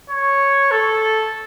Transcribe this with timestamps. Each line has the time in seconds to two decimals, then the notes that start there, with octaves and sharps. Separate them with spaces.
0.10 C#5
0.71 A4